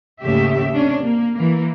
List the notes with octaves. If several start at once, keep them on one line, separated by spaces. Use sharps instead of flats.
D#2 G#2 C#3 A3 G4 E5
C3 C#4 D4
A#3
E3 A#3